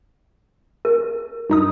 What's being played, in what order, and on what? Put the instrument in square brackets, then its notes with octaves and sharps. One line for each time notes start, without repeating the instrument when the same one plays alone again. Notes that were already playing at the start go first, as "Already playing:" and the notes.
[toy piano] A#4
[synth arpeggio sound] G2 D#4 D#6